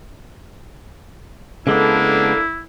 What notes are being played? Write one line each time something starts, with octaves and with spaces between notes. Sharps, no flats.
C#3 G#3 A#3 B3 D4 E4 A4